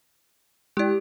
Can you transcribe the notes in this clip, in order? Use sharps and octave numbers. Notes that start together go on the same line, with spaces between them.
G#3 E4 G4 D5